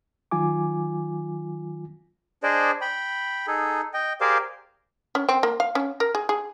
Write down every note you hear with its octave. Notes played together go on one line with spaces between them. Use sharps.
D#3 F#3 F4 G#5 D6
D4 G#4 C5 D5 D#5
G5 B5
D#4 G#4 A4
D#5 G5
G4 G#4 A#4 C5 D5 F5
C#4
C4
A#3
F5
C#4
A#4
G#4
G#4